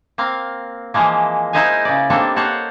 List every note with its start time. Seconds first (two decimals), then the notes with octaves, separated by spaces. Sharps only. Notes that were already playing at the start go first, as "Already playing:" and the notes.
0.18 A#3 C4 F5
0.94 E3 F3 G#3 A#3
1.53 D#4 E4 C5 D#5 F5 G#5
1.85 C#3 D5
2.10 G3 A#3 C4 D4 D#4 A4
2.36 A#3 A4 C5 C#5 F#5